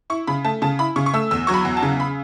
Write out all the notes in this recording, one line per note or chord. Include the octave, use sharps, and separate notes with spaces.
E4 C#6
C#3 B5
A3 A5
C#3 A5
E4 B5
C#3 C#6
C#6
A3 E6
E2 E6
F#3 C#6
B5
E2
A5
C#3
B5